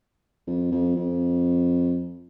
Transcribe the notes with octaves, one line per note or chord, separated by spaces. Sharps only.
F2
F2
F2